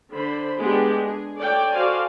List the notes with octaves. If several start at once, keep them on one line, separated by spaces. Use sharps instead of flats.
D3 C5 B5
G#3 B3 D4 G4
G#4
A4 C#5 D5 G5
F#4 A4 C5 D5 F5 G#5